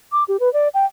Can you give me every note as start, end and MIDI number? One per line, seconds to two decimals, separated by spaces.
0.12 0.24 86
0.28 0.37 67
0.40 0.51 71
0.53 0.68 74
0.74 0.85 79